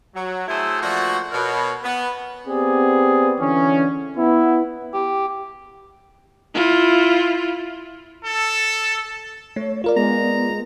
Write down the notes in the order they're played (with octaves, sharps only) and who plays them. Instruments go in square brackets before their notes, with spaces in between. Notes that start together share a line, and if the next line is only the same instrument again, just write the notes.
[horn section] F#3
F#3 A3 E4 G#4 A4 C5
F3 A3 A#3 D4 F#4
B2 A#4 C#5
B3
[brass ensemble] B3 C4 G4 G#4 D5
D3 E3 C#4
B3 E4
[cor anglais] G4
[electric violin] E4 F4
[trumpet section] A4
[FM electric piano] A3 [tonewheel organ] C#5
[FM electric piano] F4 A#4 D5
[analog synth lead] G#3 [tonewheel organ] B3 [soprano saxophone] A#5